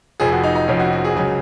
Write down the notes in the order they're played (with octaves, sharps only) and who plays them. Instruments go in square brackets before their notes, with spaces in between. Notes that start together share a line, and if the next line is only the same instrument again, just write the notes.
[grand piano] F1 F2 F3 G#4
F#4
D#4
D#4
F1 F2 F3 C#4
F#4
F#4
G#4
C#2 C#3 F#3